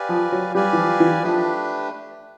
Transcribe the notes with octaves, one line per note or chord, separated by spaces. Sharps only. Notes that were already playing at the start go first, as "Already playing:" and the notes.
Already playing: G4 B4 D5 F5 G#5
F3
F#3
G3 G4 B4 D5 F5 G#5
E3
F3
E3
F3 A3 D4 G4 B4